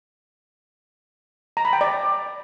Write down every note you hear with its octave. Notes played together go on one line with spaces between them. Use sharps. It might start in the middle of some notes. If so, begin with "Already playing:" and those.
A#5
B5
G5
D5